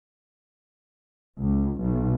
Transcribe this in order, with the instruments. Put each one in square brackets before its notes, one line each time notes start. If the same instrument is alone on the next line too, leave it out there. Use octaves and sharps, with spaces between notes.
[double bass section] C#2
B1